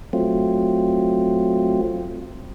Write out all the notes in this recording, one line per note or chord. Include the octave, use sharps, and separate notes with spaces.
F#3 A3 C4 F4